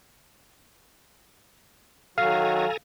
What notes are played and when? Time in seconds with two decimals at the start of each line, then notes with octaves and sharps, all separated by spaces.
2.18 D#3 F#3 F#4 A4 F5 G#5 A#5